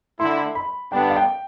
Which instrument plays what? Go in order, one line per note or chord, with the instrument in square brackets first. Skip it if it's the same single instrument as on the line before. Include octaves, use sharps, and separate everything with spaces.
[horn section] D3 A3 E4 [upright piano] C6
[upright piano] B5
[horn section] G2 D3 G3 B3 D4 [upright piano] G5
[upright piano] F5
G5